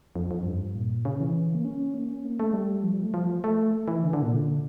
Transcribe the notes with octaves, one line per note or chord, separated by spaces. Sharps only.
F2
F2
G2
A#2
C#3
E3
A#3
C#4
A#3
C#4
A#3
A3
G3
F3
G3
A3
F3
A3
E3
D3
D3
A#2
D3